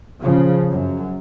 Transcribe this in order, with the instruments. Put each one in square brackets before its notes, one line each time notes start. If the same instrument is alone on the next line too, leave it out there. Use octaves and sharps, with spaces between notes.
[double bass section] C#3 F3
F#2